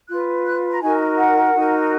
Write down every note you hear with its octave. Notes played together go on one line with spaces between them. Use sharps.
F4 B4 F#6
F#6
A#5
D#4 F#4 A#4 G#5
F#5
D#4 F#4 A#4